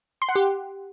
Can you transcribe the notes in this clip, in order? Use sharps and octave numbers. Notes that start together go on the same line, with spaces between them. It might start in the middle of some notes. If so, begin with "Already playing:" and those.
C6
F#5
G4